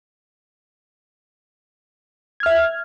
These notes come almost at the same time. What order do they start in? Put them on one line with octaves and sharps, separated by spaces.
G#6 F6 E5